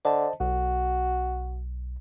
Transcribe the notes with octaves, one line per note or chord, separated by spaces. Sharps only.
D3 C5 D#5 A5
B1 F#4